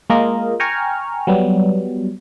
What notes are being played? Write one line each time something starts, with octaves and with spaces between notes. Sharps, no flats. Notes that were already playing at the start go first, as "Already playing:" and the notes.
G#3 A#3 F4 A#4 D#5
G5 G#5 A#5 C#6 F6
F#3 G3 B3